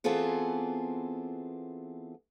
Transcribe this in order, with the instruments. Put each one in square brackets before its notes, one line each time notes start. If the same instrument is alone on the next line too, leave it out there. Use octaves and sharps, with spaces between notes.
[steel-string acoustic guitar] E3 B3 C4 F4 G#4 A4